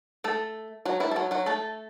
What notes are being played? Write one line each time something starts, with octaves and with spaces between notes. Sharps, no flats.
A3 A4
F#3 F#4
E3 E4
A4
F#3 F#4
F#3 F#4
A3 A4